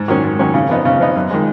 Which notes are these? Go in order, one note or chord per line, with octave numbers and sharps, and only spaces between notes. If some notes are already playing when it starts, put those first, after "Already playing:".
Already playing: G#2
D#3 F#3 C#4
G#2
D#3 F#3 C#4
C#3
F3 B3 D#4
C#3
F3 B3 D#4
F#2
D#3 G#3